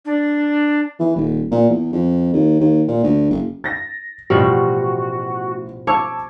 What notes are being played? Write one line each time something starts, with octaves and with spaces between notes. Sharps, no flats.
D4
E3
D#1
A#2
E2
F2
D#2
D#2
A#2
D2
F#1
A6 A#6
A1 B2 F3 G3 F#4 F6
C#5 A5 D6 E6